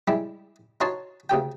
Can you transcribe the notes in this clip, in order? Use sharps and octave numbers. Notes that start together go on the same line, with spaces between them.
G3 G#3 E4 G4
D#4 F#4 C#5 A5 C6
D2 C#3 G4 G5